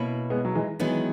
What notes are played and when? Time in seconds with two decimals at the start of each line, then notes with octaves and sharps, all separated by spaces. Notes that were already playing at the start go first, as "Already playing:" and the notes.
Already playing: B2 A#3 C#4 E4
0.30 G#3 B3
0.45 F#3
0.55 E3 G#3
0.80 D#3 E3 F#3 G#3 B3 D#4